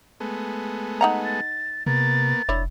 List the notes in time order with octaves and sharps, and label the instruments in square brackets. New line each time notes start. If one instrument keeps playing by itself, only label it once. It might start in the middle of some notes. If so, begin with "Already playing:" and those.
[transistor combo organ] G#3 A3 B3
[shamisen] D#4 F#5 A#5
[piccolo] A6
[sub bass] C3 [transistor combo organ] A#3 B3 [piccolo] A6
[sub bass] F1 [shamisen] D4 E4 C#5